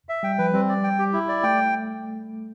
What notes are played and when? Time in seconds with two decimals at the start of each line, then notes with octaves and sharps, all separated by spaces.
0.09 E5
0.23 G3 G5
0.38 F3 B4
0.53 G3 C4
0.69 D5
0.84 G5
0.98 G4
1.13 E4
1.28 D5
1.43 A3 G5